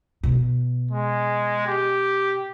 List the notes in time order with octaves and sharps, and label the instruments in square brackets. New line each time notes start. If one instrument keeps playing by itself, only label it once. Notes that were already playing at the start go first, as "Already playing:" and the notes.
[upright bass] B2
[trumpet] G#3
G4